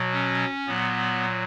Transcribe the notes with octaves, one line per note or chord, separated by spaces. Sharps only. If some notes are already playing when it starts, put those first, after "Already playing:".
Already playing: B2 F#3
C#4
A#2 F#3 B3